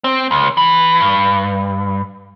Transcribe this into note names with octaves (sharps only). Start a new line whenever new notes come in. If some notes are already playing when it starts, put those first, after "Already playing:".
C4
C#2
E3
G2